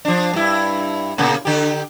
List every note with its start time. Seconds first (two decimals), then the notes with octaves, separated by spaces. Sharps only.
0.05 F3 D4
0.33 G2 E4
1.18 A#2 C#3 A#3
1.45 D3 G4